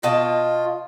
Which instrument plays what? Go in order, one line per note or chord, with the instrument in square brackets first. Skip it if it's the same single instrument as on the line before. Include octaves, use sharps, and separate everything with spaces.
[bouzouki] B2 D#5 A5 [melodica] F4